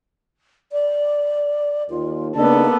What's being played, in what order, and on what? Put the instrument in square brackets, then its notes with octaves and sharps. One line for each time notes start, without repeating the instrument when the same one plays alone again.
[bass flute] D5
[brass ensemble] D#2 [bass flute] F4
[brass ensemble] C#3 D4 D#4 [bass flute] A#3 [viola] B3 A4